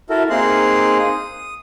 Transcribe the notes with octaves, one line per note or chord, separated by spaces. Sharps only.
E4 F#4 A4 A#4
A#3 C4 D#4 G#4 C6 F#6
D#6